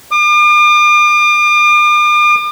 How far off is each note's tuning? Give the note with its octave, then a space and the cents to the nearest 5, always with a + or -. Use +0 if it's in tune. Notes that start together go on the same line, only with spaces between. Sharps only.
D6 +40